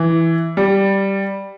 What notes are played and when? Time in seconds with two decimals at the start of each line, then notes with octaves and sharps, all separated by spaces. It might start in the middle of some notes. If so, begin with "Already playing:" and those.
Already playing: E3
0.57 G3